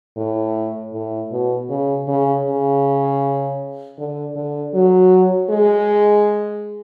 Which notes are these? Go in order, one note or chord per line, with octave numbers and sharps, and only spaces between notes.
A2
A2
B2
C#3
C#3
C#3
D3
D3
F#3
G#3